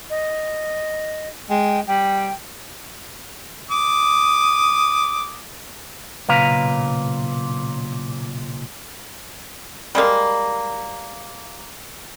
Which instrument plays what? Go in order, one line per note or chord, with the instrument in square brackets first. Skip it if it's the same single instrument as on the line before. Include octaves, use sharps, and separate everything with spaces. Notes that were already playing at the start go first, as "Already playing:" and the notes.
[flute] D#5
[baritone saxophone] G#3 [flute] G5
[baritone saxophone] G3 [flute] G5
[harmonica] D6 D#6
[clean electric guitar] B1 A#2 C#3 B4 F5 A#5
[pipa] G3 G#3 A#3